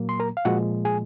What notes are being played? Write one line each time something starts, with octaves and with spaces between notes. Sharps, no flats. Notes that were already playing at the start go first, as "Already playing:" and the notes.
Already playing: A#2 F#3 A#3
C6
A#4 A#5
F5
A#2 F3 G#3 F#4 F#5
G#4 G#5